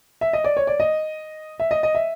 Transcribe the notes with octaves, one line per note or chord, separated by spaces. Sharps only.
E5
D#5
D5
C#5
D5
D#5
E5
D#5
D#5
E5